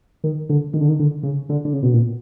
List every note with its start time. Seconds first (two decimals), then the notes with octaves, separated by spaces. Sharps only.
0.24 D#3
0.49 D3
0.74 D#3
0.81 D3
0.88 D#3
1.00 D3
1.23 C#3
1.49 D3
1.65 D3
1.73 C#3
1.83 B2
1.93 A#2